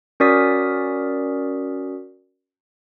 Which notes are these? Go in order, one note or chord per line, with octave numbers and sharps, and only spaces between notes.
C#4 F#4 A#4 D5 D#6 B6